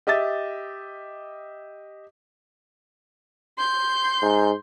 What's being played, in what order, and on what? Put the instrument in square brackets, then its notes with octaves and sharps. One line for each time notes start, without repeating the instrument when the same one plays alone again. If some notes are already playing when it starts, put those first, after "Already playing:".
[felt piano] G4 D#5 E5 A6
[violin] C6 G6
[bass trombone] G#2